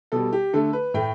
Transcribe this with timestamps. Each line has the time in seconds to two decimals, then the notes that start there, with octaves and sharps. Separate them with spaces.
0.12 B2 G3 A4
0.33 G4
0.53 D3 A3 A4
0.73 B4
0.94 A2 A3 G5